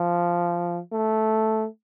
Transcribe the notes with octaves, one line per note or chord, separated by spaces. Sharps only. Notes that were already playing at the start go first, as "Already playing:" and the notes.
Already playing: F3
A3